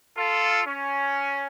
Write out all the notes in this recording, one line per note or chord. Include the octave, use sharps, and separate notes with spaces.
F4 A4
C#4